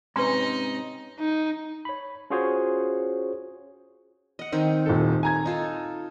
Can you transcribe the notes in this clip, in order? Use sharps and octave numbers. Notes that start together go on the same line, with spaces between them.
G#2 C3 C#4 D#4 B4 D#5 C6
D#4
C#5 B5
C#4 F4 F#4 G#4 C5 C#5
D#5 F#5
D#3 C4 D#4
D#1 A4
G#5 A#5 G#6
D#4 F4 A4